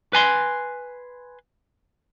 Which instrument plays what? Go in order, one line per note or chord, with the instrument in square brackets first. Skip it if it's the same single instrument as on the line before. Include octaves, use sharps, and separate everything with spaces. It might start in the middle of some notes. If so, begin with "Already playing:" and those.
[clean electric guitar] B4 G#5 C6